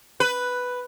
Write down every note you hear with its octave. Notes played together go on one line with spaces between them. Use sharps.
B4